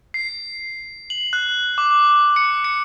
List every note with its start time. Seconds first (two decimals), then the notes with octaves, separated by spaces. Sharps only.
0.14 C7
1.10 F#7
1.33 F#6
1.78 D6
2.36 C#7
2.64 C#7